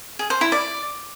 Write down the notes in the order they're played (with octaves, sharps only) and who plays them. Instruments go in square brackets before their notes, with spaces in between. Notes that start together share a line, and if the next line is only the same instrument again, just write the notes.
[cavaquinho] G#4
C5
E4
D5